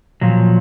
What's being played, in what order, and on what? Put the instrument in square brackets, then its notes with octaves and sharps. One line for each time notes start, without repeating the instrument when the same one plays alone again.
[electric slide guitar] A#2 F3 F#3